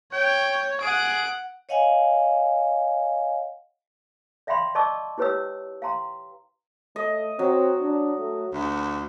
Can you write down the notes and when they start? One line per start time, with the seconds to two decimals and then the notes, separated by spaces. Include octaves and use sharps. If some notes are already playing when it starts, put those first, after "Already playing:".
0.13 C#5 G5
0.81 G#4 F#5 D7
1.69 C#5 D#5 F5 F#5 G#5
4.47 D5 E5 F5 G5 B5 C6
4.75 D5 D#5 A5 C#6 D6 E6
5.18 E4 G4 B4 C#5 G5 E6
5.82 F5 G5 A#5 C6
6.96 A3 D#5
7.39 F#3 C4
7.80 D4
8.19 A3
8.53 D2